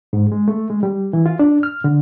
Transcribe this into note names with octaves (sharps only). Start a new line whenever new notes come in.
G#2
G#3
A3
G#3
G3
E3
F4
D4
F6
D3